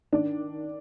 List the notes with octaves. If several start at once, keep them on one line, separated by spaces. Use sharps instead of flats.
D#3 D4